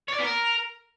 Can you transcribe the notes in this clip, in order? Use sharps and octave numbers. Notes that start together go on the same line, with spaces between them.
C#5
D5
B3
A#4